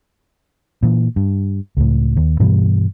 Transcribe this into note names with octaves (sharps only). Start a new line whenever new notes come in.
A#2 E3
G2
C#2 A2
D#2
G2 B2 E3 G3